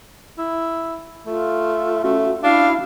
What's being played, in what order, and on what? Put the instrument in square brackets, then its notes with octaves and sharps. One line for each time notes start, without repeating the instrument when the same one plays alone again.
[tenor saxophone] E4
[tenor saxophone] A3 [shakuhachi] F4
[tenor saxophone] A3 [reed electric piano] C#4 F#4
[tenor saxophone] D4 [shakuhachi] E4 [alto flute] F5